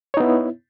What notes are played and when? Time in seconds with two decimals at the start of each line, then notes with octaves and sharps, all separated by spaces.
0.14 C#5
0.17 D#4
0.20 B3
0.23 E4